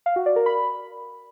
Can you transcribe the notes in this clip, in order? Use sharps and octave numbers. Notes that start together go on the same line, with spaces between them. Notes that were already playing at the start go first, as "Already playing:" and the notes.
F5
F#4
D5
A#4
B5